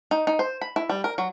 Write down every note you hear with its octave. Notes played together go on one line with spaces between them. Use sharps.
D#4
D#4
C5
B5
E4
G3
A#4
F#3